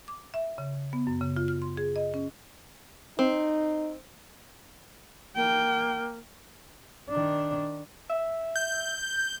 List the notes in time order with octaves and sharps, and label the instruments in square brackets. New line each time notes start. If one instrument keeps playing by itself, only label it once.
[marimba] D6
E5
C#3
B3
F#2
C#3
F4
F6
C6
G#4
D#5
C#4
[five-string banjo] C4 [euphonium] D#4
[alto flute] A#3 [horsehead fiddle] G5
[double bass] D#3 D4
[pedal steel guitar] E5
[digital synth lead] G6